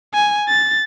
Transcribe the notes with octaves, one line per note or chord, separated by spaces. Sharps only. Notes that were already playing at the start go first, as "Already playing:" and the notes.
G#5
A6